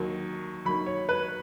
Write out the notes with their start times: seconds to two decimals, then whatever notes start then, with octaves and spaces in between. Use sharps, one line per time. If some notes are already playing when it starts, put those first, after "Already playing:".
Already playing: D#2 D#3 F#3
0.65 D#2 D#3 F#3 B5
0.86 C#5
1.09 B4